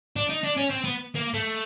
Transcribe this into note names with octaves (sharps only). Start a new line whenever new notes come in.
D4
D#4
D4
C#4
C4
B3
A#3
A3